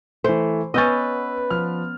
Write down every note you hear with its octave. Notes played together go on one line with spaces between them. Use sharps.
E3 A3 C5
B3 C#4 B4 D#5 E6 G6 A6
F3 F6